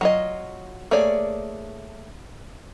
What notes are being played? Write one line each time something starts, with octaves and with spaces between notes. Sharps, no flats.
F#3 F4 D#5
A3 A#3 G#4 C#5 D5